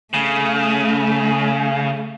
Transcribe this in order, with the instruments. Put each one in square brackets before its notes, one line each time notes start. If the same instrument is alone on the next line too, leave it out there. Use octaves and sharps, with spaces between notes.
[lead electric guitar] C#3 [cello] A3